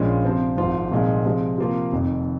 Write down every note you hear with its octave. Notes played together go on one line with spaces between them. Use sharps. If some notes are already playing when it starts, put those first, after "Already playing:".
Already playing: A#1 A#2 G#3 C#4 F4
C3 F3 C4
G#1 G#2 F3 C4 F4
C2 A#2 F3 G#3 D#4
C3 F3 G#3
C3 F3 A#3 F4
F1 F2 D#3